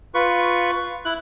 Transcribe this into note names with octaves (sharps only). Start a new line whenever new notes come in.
F4 B4 C#6
E4 F#6